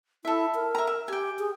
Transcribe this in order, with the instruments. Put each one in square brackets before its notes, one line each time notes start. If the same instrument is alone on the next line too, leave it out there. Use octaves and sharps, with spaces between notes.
[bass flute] E4 [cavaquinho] A4 E5
[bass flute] A#4
[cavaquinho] E5 A#5
E5
[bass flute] G4 [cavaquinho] G5 G#5
[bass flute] G#4